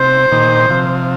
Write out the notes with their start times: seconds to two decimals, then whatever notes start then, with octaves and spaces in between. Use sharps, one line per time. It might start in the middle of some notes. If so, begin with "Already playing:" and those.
Already playing: C3 C5
0.32 A#2 D#3
0.70 C3 F3